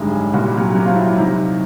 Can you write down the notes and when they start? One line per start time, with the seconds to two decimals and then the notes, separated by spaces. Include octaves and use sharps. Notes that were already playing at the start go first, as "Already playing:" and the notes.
Already playing: G#1 F#2 D3 G3 G#3 G#4
0.34 C2 A#2 G3 F#4
0.46 G4
0.57 F#3 F#4
0.75 F#3 F#4
0.86 F3 F4
0.96 E4
1.18 C3 D#3 F#3